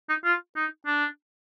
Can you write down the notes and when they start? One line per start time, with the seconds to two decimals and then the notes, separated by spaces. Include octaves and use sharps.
0.09 D#4
0.25 F4
0.56 D#4
0.86 D4